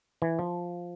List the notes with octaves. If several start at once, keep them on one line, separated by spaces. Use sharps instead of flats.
E3
F3